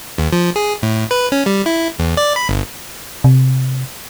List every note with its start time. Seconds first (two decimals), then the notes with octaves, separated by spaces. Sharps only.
0.18 D#2
0.33 F3
0.56 G#4
0.83 A2
1.11 B4
1.32 C#4
1.46 G3
1.66 E4
1.99 E2
2.17 D5
2.36 B5
2.49 G1
3.24 C3